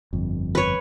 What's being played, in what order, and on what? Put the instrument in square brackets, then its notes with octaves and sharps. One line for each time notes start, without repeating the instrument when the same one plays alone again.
[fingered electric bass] G1 F2
[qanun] B4 C#5